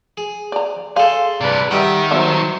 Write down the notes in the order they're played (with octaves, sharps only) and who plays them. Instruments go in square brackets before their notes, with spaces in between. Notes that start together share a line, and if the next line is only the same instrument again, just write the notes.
[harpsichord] G#4
[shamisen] D5 A#5
[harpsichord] G#4 A4 [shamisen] F5 [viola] C6
[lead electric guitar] G2 C3 [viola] B4 D5
[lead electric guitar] D#3 [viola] G3 E5 [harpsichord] G4 D#5 F#5
[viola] F#3 C5 [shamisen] B3 A4 E5